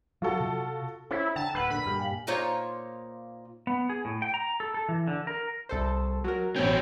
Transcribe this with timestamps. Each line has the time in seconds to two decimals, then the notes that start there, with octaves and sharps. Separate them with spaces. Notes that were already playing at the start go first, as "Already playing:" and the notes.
0.22 F#3 F4 F#4 A4
0.40 C3
1.11 C#4 E4 A4 C5
1.36 D3 G5 A5 A#5
1.55 D1 B4 F#5 E6 F6
1.70 A#2 D3 B5
1.86 G2 A#2 G3 F6
1.99 F5 G5 G#5
2.27 A#2 A#3 D#4 F4 C5 C#5
3.67 B3
3.89 G#4
4.05 A2
4.22 G5
4.34 A#5
4.60 A4
4.74 A4
4.89 E3
5.08 D3
5.27 A#4
5.69 C2 A4 C5
6.24 F#3 A#4
6.56 A1 B2 C4 C#4 G5